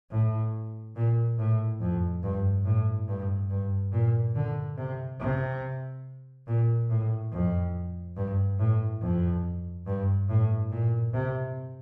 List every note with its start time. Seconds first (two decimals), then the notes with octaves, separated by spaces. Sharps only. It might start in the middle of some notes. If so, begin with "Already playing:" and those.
0.10 A2
0.96 A#2
1.38 A2
1.81 F2
2.23 G2
2.65 A2
3.08 G2
3.50 G2
3.92 A#2
4.35 D3
4.77 C3
5.20 C3
6.47 A#2
6.89 A2
7.32 F2
8.17 G2
8.59 A2
9.01 F2
9.86 G2
10.29 A2
10.71 A#2
11.14 C3